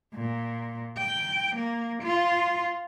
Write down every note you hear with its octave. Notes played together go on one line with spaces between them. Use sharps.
A#2
G5
A#3
F4